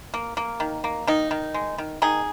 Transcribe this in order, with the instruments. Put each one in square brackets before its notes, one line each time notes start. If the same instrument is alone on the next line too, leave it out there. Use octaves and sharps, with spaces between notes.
[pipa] A#3
A#3
D#3
A#3
D#3 D#4
D#3
G#3
D#3
D#3 D#4 G#4